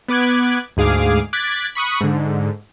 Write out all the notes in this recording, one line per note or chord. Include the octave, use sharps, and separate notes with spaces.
B3 B4 D6 F#6 G#6
D2 G#2 G#4 F5 D6
D6 F#6 G#6 A6 B6
B5 C#6 D#6 F#6
G#2 D3